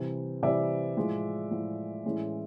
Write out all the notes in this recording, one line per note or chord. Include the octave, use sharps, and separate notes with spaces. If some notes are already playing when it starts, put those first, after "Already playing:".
Already playing: C3 E3 G3 C4
C3 E3 G3 C4 D5 E5
A2 F3 G#3
A2 F3 G#3
A2 E3 G#3 C#4